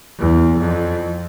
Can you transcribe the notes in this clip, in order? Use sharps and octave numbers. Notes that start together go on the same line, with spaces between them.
E2
F2